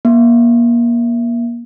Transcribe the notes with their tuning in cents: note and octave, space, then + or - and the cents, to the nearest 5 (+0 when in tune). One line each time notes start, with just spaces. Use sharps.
A#3 +30